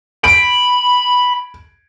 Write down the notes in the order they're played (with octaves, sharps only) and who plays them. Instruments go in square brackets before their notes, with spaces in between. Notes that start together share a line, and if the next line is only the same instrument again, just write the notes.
[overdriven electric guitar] B5 [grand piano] D7